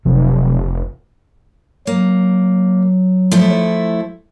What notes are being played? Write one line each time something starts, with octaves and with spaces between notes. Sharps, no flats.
F1 C3 F3 F#3
F#3 A#3
F3 A3 E4